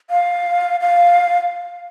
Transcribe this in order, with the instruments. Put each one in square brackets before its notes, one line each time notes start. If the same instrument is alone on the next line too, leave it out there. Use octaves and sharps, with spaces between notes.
[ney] F5
F5